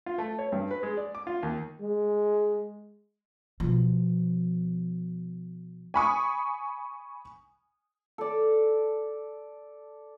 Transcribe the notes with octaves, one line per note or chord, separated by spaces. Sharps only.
F4
A3
C#5
G2
B4
G#3
D5
D6
F4
D#2
G#3
B2 F3
G#5 B5 C#6 D#6
A4 D5